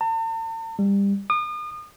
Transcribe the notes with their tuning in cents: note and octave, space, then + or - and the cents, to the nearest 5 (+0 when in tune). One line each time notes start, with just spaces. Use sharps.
A5 +45
G3 +25
D#6 -40